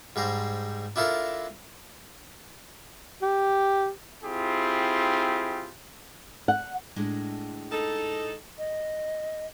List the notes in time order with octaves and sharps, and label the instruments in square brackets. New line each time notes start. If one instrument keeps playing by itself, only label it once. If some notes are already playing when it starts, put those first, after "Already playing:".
[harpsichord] G#2 G3 C5 A#5
D4 E4 F4 A4 A#4 A#5
[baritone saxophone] G4
[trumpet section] C4 E4 F4 G4 G#4
[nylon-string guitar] F#5
[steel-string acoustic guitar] A2 G#3 D4
[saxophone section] D#4 A4
[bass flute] D#5